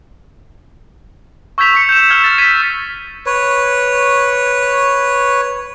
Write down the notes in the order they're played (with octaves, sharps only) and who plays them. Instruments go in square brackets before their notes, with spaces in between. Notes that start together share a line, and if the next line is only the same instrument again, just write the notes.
[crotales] C#6 E6 G6 G#6 B6 F7
C#6 B6 C#7
G6 E7
E6 F6 G#6
A6
G#6 B6 D#7
[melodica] B4 C#5